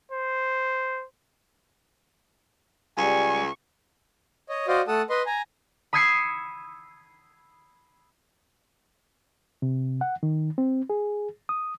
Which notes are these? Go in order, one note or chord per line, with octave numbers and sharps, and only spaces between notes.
C5
C#2 G3 G#5 C#6
C#5 D#5
F#4 C5 D5 D#5 F5
A3 A4 F#5 A5 D#6
B4 D#5 C6
G#5 A#5
B5 D#6 E6 G#6 C7 C#7
C3
F#5
D#3
C4
G#4
D#6